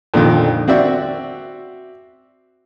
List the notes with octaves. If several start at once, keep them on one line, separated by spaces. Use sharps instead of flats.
F2 A#2 D3 D#3
C4 F#4 D5 E5